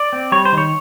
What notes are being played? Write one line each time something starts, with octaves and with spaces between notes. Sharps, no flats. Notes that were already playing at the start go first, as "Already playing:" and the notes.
Already playing: D5
C4
G3 C#5
C5
D#3
C#5